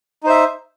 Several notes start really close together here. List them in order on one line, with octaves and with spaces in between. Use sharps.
D#4 C5 E5